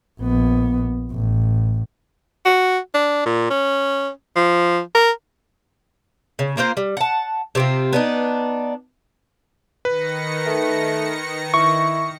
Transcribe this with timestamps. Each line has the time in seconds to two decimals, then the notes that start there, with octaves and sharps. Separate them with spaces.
0.21 A#1 B3
1.12 A1
2.45 F#4
2.94 D4
3.26 A#2
3.51 C#4
4.36 F3
4.95 A#4
6.39 C#3
6.57 A#3 F4 A#4 C5
6.77 G3
6.97 F#5 A5
7.55 C3 C4 F4
7.93 B3 D4 D#4
9.85 D#3 B4 A#6 C#7
10.47 A3
11.54 E4 C#6